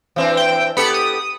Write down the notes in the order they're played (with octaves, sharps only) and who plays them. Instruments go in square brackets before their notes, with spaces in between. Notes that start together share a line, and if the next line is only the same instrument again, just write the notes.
[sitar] E3 C4 D4
[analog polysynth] G5
[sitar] B3 G4 A4 [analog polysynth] B5 C#7
[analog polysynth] D#6